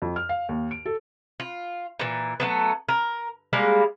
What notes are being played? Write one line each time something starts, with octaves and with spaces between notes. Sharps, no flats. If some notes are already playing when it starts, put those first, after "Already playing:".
F2
F6
F5
D#2
D7
A4
F4
A#2 E3
F#3 A3 B3
A#4
G3 G#3 A#3 F5